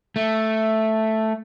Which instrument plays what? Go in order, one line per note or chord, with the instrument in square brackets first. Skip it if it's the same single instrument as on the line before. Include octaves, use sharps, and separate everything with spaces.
[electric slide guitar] A3